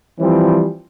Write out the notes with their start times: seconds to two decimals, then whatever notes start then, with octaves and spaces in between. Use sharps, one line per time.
0.20 E3 F3 G3 C4